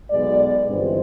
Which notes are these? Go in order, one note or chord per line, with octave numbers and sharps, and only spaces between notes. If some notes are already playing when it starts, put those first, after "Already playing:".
B1 B2 G#3 B3 D5
G1 G2 E3 G#3 C4